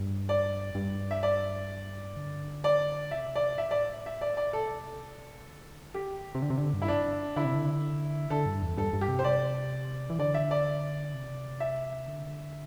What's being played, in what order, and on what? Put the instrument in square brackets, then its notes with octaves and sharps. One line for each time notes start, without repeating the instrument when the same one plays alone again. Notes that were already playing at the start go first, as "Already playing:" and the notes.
Already playing: [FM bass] G2
[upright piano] D5
[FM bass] G2
[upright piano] E5
D5
[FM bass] D3
[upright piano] D5
[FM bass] C3 [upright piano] E5
[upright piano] D5
[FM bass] A2 [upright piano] E5
[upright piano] D5
E5
D5
D5
[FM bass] C3 [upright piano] A4
[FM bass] D3
[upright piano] G4
[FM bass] C3
D3
C3
D3
G2
[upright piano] E4
D4
[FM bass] D3 [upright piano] E4
[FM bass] C3
D3
[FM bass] D3 [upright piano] A4
[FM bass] G2
E2
[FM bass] G2 [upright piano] A4
[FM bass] G2
[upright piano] G4
[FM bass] C3
[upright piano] C5
D5
[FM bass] E3
[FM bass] D3 [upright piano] D5
[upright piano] E5
D5
[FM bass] C3
[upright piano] E5
[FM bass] D3